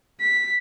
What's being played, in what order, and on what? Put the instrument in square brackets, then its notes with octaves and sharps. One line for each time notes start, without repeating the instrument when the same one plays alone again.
[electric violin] B6